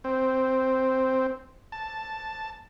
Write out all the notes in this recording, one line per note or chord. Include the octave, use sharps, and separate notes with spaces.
C4
A5